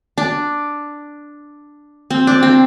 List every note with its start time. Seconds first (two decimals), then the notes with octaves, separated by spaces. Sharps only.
0.18 D4
2.10 C4
2.27 D4
2.43 C4